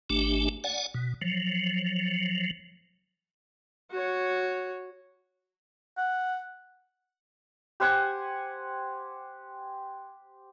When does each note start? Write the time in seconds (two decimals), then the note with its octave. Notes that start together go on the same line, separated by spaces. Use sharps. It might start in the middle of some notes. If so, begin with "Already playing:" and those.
0.10 G#1 A3 D4 G4
0.64 D5 F#5 G#5
0.94 B2
1.21 F3 F#3
3.91 F#4 C#5
5.97 F#5
7.80 G4 C5 F#5 G#5